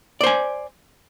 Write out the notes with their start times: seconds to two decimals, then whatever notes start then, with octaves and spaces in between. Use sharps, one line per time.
0.21 D5
0.24 C5
0.27 G#5